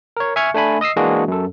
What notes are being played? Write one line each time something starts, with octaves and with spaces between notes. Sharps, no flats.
A#4 C#5
E5 G#5 C#6 F6 G#6 C#7
A3 D4 G#5 B5
D#5 D#6 E6 C7
E3 G#3 A#3 D4 F#4 G#4
F#2 A4